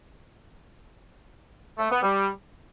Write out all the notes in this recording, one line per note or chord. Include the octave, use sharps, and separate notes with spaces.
A3
B3
G3